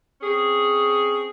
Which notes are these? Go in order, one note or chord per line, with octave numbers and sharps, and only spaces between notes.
C4 C#4 G#4